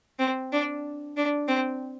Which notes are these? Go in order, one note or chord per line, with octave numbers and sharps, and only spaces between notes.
C4
D4
D4
C4